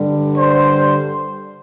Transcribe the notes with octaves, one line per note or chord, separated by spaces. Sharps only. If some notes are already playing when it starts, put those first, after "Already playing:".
Already playing: G2 D3 G3
C5